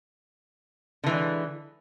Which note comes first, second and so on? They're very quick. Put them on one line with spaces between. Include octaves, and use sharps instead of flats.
D3 E3 G#3